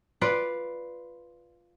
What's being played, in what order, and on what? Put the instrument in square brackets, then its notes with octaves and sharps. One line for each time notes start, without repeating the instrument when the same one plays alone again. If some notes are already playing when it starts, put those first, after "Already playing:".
[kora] F4 B4 D5